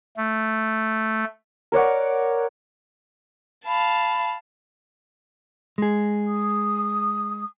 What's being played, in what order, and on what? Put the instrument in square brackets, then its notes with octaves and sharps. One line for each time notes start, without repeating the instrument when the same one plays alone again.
[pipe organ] A3
[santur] A#4 C#5 D5 F#5
[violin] F5 A5 [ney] B5
[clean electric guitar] G#3 G#4
[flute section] D#6